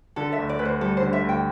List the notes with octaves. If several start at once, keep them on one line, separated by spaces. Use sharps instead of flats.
D3 A4
E5
D2
D5
D2 B4
C5
G3 A4
C5
D3
E5
D2
G5